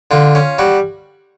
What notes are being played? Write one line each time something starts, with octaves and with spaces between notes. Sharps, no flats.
D3 F4
C#4
G3 F#4